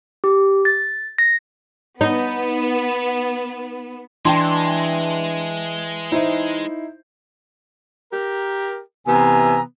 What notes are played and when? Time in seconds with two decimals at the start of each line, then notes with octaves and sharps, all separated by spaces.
0.24 G4
0.65 A6
1.18 A#6
2.01 B3 D#4
4.25 E3 G#3 D4 G5 A5 C6
6.12 D#4 E4 C5
8.12 G4 A#4
9.07 C3 E3 B3 G#5 A#5 E6